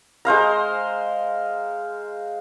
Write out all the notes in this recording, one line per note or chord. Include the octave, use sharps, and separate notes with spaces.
G#3 C5 F5 A#5